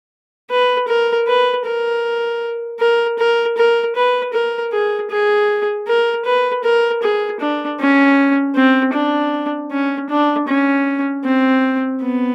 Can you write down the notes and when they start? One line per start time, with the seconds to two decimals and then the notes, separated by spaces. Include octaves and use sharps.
0.50 B4
0.88 A#4
1.27 B4
1.65 A#4
2.80 A#4
3.18 A#4
3.57 A#4
3.95 B4
4.33 A#4
4.72 G#4
5.10 G#4
5.87 A#4
6.25 B4
6.64 A#4
7.02 G#4
7.40 D4
7.80 C#4
8.55 C4
8.94 D4
9.71 C#4
10.09 D4
10.48 C#4
11.24 C4
12.01 B3